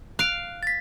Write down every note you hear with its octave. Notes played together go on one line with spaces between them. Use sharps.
F5 F#6 D7
A6 B6